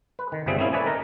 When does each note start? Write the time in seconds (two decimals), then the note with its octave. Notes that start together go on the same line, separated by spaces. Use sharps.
0.19 B4
0.32 D#3
0.46 G1 A#2 G3 C4 G#4 E5
0.59 A#3 C4 C#4 E4 G#4
0.73 A4 B4 C#5 D5 E5 G#5
0.86 D#4 A#4 A#5